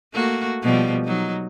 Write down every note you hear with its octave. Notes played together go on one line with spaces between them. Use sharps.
A3 A#3 F#4
B2 F3 G3
F#3 D#4